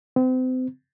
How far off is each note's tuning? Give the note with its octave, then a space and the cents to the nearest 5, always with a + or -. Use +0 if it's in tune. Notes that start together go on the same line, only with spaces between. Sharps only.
C4 -35